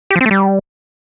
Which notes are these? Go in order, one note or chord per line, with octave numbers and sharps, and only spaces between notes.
G4
F3
C4
A3
G3